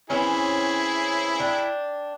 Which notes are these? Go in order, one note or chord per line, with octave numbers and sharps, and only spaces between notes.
E3 C4 C#4 E4 G#4
D4 G5